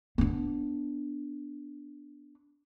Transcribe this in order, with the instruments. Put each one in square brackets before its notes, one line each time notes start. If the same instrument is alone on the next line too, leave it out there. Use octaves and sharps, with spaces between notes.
[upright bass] B3 D4